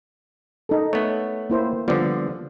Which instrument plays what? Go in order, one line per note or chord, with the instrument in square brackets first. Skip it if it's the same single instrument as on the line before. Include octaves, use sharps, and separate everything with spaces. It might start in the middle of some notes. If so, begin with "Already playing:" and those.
[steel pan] D#4 A4
[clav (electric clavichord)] A3 B3 [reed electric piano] C#5
[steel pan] A#3 E4 C5
[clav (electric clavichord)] D3 F3 [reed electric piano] G3 B3 D5